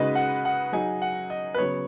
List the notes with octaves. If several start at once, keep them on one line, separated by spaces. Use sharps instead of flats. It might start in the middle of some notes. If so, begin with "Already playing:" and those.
Already playing: C#3 G#3 D#4 F#4 B4 D#5
F#5
F#5
F#3 D#4 G#4 G#5
F#5
D#5
B4
C#3 F#3 B3 C#5